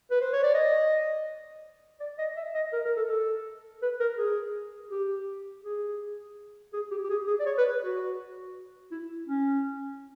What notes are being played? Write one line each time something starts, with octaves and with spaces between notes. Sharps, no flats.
B4
C5
C#5
D5
D#5
D5
D#5
E5
D#5
A#4
A#4
A4
A4
B4
A#4
G#4
G4
G#4
G#4
G4
G4
G#4
G#4
D5
C#5
B4
F#4
E4
C#4